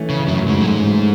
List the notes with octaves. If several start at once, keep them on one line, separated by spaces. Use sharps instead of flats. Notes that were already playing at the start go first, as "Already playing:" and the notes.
Already playing: E3 A3 C#4
C#3
F#2 F#3
G#2 G#3
F#3
G#2 G#3